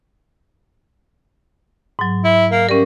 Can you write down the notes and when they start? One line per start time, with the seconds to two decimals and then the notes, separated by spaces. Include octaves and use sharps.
1.99 G#2 F#3
2.24 E4
2.51 A#3
2.69 G3 C#4 A#4